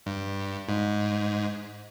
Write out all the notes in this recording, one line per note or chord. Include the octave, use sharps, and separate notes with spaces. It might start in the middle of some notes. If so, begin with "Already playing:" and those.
G2
G#2